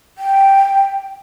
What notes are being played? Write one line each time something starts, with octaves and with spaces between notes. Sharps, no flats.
G5